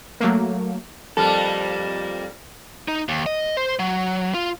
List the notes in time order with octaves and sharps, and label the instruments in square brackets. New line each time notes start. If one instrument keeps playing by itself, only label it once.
[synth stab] F#3 A3 A#3
[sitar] F2 G3 A#3 [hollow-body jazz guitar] A4
[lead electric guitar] D#4
D#2
D#5
C5
F#3
F4